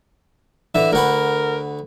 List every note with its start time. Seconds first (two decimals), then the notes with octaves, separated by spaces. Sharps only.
0.75 D3 E3 E5
0.93 D2 F#4 A#4 B4